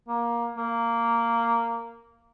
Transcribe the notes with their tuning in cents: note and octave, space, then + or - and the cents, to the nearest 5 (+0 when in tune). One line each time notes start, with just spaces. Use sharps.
A#3 +15
A#3 -10